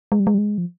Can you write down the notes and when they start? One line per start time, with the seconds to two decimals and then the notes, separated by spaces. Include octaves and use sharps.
0.12 G#3
0.20 G3
0.27 G#3
0.34 G3
0.38 G#3
0.58 F3